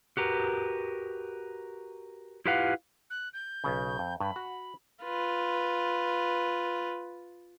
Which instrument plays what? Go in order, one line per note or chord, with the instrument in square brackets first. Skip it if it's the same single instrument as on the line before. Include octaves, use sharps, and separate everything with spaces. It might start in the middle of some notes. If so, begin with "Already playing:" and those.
[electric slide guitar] F#4 G4 A#4 B4
E4 F4 G4 B4 F5 F#5
[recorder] F#6
G6
[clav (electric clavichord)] B1 C#3
F2
[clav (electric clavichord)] G2 [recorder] B5
[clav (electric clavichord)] F#4
[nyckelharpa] F4 B4